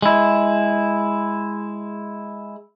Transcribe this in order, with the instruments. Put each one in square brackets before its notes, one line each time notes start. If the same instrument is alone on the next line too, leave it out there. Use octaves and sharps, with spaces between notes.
[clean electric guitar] G#3 E4